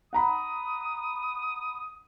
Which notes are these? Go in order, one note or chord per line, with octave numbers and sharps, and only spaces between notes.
F#5 A#5 B5 D#6